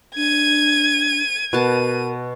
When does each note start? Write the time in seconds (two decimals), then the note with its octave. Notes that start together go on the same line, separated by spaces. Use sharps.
0.16 D4 G#6 D#7
1.53 B2 A#4 A5 D#7